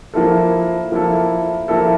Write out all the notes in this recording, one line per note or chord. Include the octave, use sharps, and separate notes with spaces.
F3 A#3 E4 A4
F3 A#3 E4 A4
F3 A#3 E4 A4